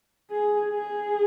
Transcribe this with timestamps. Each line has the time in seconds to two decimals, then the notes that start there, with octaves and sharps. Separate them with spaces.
0.31 G#4
0.72 G#4